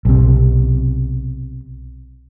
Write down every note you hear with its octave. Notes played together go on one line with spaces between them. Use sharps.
B1 C3